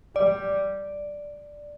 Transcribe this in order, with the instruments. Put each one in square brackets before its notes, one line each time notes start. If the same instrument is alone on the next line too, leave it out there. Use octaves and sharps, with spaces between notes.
[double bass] G3 [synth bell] D5